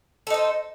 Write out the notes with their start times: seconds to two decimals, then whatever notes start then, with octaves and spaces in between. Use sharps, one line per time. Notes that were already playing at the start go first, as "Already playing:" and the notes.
0.27 A4
0.30 D#4
0.34 C5